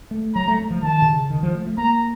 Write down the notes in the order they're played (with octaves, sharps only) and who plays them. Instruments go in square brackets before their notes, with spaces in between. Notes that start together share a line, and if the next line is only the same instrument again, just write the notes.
[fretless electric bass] A3
[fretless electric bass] F#3 [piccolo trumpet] A#5
[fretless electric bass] A3
A3
F3
[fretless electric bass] D#3 [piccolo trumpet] A5
[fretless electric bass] C3
C#3
D#3
F3
A3
A3
[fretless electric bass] A#3 [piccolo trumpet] A#5